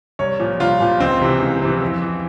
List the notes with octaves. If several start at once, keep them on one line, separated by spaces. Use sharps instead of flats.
C2 C#5
A#2 F3
C2 F4
A#2 F3
C#2 C4
C3 E3
C#2
C3 E3
F2
E3